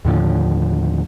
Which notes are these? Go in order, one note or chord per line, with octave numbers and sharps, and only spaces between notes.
D#2 A2 D3 F3